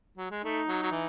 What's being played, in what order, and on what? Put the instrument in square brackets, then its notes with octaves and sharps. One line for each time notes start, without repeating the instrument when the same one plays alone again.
[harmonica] F#3
G#3
[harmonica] A3 [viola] D#4
[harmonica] F#3
F#3
E3